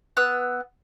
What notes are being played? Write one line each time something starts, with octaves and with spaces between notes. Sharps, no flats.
B3 E6 F#6